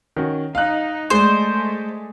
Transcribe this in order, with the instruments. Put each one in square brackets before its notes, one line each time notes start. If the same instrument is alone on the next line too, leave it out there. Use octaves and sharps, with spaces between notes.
[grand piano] D#3 C#4 F#4
[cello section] D#4 [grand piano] F5 F#6
[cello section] G#3 A3 [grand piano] G#4 D5 [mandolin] C5